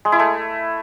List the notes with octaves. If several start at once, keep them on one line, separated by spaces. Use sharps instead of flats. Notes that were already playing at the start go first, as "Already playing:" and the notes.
G#3
E4
A3